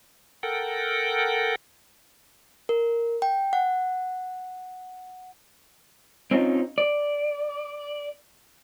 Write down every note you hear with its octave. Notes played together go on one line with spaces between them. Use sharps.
A4 A#4 F#5 G5
A#4
G5
F#5
C4 C#4 D#4 F4
D5